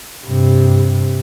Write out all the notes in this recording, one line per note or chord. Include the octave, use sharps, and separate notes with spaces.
G2 C3